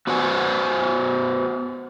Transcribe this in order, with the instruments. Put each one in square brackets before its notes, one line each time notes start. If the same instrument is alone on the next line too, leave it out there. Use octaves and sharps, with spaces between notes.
[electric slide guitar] B3 F#4 B4 C5 F#5 G#5